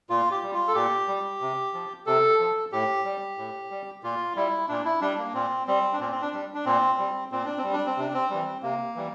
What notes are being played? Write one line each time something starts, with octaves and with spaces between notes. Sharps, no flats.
A#2 F4
G4
G3
F4
A4
A#2 G4
G3
C3
F3
C3 A4
F3
A2 G4
G3
A2
G3
A#2 F4
G3 E4
A#2 D4
E4
G3 D4
A#3
A#2 C4
G3 C4
D4
A#2 C4
C4
D4
G3
D4
A#2 C4
G3
A#2 C4
D4
C4
G3
D4
C4
C3 D4
C4
E3 G3
C3 A#3
E3 G3